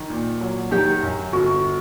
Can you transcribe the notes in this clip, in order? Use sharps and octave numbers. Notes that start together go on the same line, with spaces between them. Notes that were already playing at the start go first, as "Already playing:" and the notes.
Already playing: D#3
A#2
F#3
D#3 G4
F#2
G1 F#4